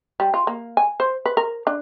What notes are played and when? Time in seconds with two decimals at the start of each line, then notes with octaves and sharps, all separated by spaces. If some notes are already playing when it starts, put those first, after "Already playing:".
0.20 G3
0.34 F4
0.47 A#3
0.77 G#5
1.00 C5
1.25 B4
1.37 A#4
1.67 D4